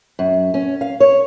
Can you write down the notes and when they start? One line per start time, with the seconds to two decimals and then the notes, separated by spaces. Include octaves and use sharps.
0.19 F#2
0.54 C#4
0.81 F5
1.00 C#5